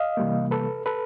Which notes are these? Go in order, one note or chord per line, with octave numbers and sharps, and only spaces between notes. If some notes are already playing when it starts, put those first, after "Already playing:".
Already playing: D#5 F5
C3 E3 G3 A#3
A4 B4
A4 B4